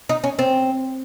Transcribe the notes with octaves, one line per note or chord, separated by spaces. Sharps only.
D#4
C#4
C4